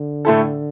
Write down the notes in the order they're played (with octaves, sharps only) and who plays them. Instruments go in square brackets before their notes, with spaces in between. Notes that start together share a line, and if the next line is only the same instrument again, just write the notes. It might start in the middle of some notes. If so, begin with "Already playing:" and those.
Already playing: [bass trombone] D3
[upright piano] A2 A3 E4 A4